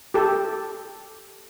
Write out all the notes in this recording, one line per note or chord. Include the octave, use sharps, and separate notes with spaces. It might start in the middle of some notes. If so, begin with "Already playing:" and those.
G4 A4